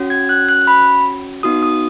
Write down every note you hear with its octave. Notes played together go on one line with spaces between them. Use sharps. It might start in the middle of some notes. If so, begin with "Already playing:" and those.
Already playing: C#4 F#4
G#6
F#6
F#6
B5
B3 D#4 F#4 D#6
D#6